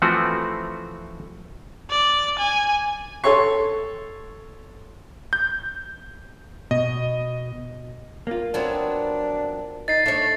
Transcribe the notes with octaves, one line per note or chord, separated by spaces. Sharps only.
E3 F3 A3 C4 F#4
D5
G#5
A4 C#5 C6 C#6
G6
B2 D#5
A#3 F4
F#3 B3 C4 D4
D#4 A6 C7
A3 D4 C#5